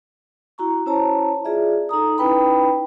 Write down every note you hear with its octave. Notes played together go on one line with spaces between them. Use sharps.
E4 F#4 A#5 C#6
C#4 E4 C5 C#5 A5 A#5
F4 G#4 D5 E5
D#4 A4 A#5 D#6
C#4 D#4 E4 B4 G5 B5